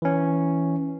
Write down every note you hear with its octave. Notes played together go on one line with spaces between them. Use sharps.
E3 C#4